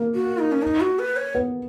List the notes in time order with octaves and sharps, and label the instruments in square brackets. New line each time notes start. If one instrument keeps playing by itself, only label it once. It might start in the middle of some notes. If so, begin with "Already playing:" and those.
Already playing: [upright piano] A#3
[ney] F#4
D#4
C#4
D#4
F#4
B4
C#5
[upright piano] B3